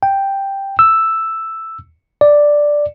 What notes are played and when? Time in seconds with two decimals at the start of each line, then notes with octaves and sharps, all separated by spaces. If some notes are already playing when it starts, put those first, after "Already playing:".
0.03 G5
0.79 E6
2.21 D5